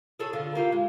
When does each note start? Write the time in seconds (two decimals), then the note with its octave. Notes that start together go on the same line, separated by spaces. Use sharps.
0.19 G#4 A4 C#5
0.33 D3 F4
0.55 A#3 F4 G4
0.72 G#3